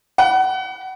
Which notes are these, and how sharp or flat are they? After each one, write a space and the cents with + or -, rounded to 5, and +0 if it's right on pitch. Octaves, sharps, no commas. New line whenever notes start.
F#5 +30